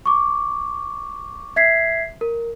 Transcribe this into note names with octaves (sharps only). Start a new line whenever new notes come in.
C#6 D6
E5 G#6 B6 C7
A#4